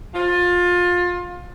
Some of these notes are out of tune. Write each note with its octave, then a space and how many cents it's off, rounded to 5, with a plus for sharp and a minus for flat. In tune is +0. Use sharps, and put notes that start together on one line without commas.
F4 +25